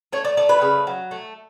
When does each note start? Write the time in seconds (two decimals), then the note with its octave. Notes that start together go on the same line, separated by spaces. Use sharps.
0.13 A3 C#5
0.25 D5
0.37 A3 D5
0.49 B4
0.62 C#3
0.87 F#3
1.11 A3